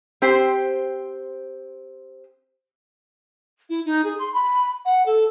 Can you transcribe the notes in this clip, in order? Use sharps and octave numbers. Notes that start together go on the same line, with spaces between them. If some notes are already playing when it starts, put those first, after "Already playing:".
C4 G4 C5
E4
D#4
G#4
C6
B5
F#5
A4